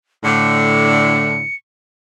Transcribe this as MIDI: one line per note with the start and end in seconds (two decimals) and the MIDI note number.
0.25 1.43 45
0.25 1.43 50
0.25 1.55 97